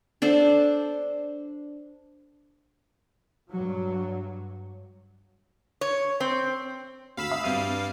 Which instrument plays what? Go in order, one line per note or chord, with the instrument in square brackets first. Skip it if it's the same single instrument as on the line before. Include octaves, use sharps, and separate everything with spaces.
[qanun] D4 A4 C5
[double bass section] G2 F#3
[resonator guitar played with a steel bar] C#5
C4
[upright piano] D2 [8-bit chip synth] F5 B5 E6
[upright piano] E5 D#6
[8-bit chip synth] G2 G3 F5 [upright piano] C4 D#7